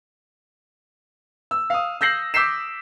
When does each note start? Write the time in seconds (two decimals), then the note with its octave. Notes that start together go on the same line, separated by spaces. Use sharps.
1.51 E6
1.70 F5 D#6
2.01 E6 G6 A#6 C7 F#7
2.34 D6 E6 G6 B6 C7 E7